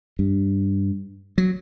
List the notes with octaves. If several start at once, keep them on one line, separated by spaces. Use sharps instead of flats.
G2
F#3